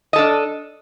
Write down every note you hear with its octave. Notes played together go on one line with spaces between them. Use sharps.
D4 A4 D#5